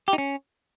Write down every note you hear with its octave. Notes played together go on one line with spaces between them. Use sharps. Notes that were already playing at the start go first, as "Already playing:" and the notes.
G4
D#4
C#4